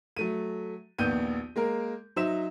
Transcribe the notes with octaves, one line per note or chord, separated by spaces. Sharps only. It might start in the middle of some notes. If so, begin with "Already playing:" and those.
F#3 A3 D#7
A#1 D#2 B3 G6 D#7
G#3 A#3 A#4
F#3 D#4 C5 E5 E7